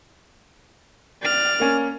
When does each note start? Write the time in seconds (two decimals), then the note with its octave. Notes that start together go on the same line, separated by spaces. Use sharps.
1.22 D5 F6
1.60 A#3 C#4